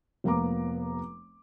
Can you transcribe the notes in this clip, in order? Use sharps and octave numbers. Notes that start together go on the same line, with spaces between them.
F1 F3 A#3 B3 A#5 D6